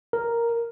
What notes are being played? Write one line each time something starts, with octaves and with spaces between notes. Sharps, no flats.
A#4